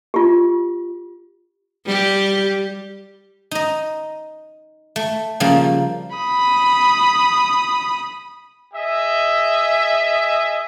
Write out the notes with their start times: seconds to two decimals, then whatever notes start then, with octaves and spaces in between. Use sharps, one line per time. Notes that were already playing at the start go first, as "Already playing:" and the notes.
0.14 F4 G4
1.86 G3 G4
3.51 D#4 D#5
4.96 A3
5.40 C#3 F3 G3 A#3
6.16 B5 D#6
8.74 G#4 D#5 E5